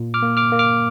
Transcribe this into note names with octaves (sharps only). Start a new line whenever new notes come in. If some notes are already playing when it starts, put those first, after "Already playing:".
Already playing: A#2
D6 F6
A#3
D6 F6
A#3
D6 F6